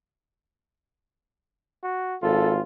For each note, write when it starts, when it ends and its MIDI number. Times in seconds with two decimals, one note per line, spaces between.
1.83 2.17 66
2.22 2.61 32
2.22 2.62 65
2.22 2.51 69